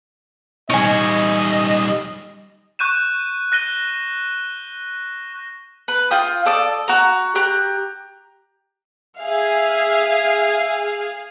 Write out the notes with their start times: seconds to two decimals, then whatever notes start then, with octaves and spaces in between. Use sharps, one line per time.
0.70 G3 D#4 C#5 D#5 G#5
2.79 C#6 F#6 G6 D#7 E7
3.52 F#6 A#6 D#7 G7
5.88 B4
6.11 F4 G5 D#6
6.46 A4 D5 D#6
6.88 F#4 A#5
7.35 G4 A#5 F#6
9.20 G#4 E5 F5